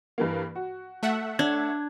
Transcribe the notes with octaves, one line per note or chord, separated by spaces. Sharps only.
G2 E3 A#3
F#4
A3 E5 F#5
D4 G#6